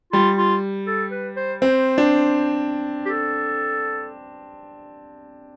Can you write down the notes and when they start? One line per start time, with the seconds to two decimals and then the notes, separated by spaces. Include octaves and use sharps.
0.13 G3 F4
0.38 F4
0.87 A4
1.11 B4
1.37 C5
1.62 C4 C5
1.98 D4
3.06 G4
3.09 A4